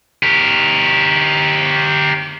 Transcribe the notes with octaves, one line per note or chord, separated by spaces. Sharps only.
G4 A#4